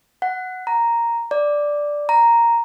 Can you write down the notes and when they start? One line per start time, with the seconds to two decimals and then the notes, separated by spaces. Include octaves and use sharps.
0.22 F#5
0.67 A#5
1.31 D5
2.09 A#5